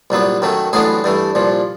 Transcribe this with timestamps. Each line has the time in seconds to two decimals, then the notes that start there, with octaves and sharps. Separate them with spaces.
0.10 C2 A#2 F#3 B3
0.42 F#2 D#3 F#3 A3
0.73 A1 A2 F#3 B3 D4 G#4
1.04 G2 E3 A3
1.35 C2 A#2 F3